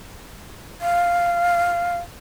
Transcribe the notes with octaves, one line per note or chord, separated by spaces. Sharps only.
F5